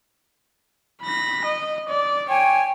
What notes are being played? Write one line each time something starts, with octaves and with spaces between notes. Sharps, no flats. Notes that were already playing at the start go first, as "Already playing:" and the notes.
B5 A#6
D#5
D5
C#5 G5 G#5